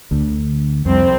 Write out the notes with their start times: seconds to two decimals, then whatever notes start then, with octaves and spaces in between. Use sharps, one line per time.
0.11 D2 D3
0.86 C2 F2 C4